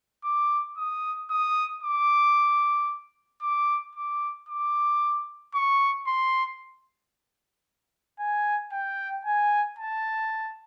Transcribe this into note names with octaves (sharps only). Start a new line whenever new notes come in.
D6
D#6
D#6
D6
D6
D6
D6
C#6
C6
G#5
G5
G#5
A5